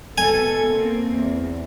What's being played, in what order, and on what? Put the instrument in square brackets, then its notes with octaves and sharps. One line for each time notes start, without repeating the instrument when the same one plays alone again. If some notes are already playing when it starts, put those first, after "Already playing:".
[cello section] B2 A4 [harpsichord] G#5
[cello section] A#3 C4
E2